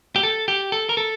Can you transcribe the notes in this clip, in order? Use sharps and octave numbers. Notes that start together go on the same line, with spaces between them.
G4
A4
G4
A4
A#4
A4